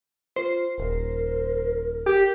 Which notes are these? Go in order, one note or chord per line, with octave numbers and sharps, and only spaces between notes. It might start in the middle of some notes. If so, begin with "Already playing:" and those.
F4 C5
D#1 A#4
G4